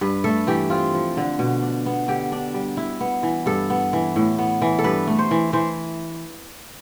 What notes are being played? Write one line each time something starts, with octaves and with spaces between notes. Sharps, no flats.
G2 B4
A3 A4
E3 G4
C4 F4
F3
D3
B2
D4
B3
D3 G4
D4
G3
E4
B3
E3
G2 A4
B3
E3
A2
B3
E3
A4
G2 B4
A3
C5
E3
E3 C5